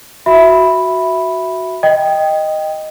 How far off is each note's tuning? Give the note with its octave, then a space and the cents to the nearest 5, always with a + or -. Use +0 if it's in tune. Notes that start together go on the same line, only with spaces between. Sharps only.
F#4 +0 E5 +0 B5 +0
D#5 +0 G5 +5